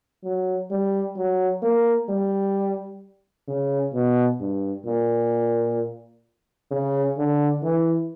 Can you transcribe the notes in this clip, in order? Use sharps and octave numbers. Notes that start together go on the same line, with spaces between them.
F#3
G3
F#3
A#3
G3
C#3
B2
G2
A#2
C#3
D3
E3